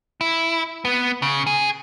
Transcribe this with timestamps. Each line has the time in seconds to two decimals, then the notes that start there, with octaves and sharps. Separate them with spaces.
0.21 E4
0.85 B3
1.22 C#3
1.47 G#4